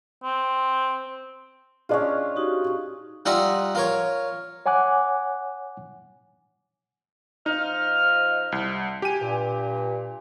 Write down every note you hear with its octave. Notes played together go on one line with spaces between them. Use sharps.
C4
C#4 D4 F4 G#4 D#5
D#4 F#4 G4
G3 D#4 F4 D#5 E5 F#5
F4 A#4 C#5
C#5 F#5 G#5 D6 F#6
F3 D#4 D#5 F6
C2
G4 G#5 D#7
G2 A#2